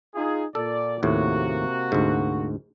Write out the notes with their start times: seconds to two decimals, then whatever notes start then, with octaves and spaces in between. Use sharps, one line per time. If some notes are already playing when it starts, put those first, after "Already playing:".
0.15 D#4 F4 G#4
0.55 A#2 A4 D5
1.03 D#2 A2 C3 A#3 F#4
1.92 D2 G#2